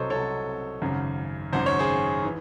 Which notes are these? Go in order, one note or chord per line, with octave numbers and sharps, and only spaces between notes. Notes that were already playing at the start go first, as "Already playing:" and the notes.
Already playing: C2 C3 F#3 A4 C5 C#5 D#5
C2 C3 F#3 A4 C#5
G#1 F#2 C#3
G#1 F#2 C#3 C5
C#5
G#4 C5
E3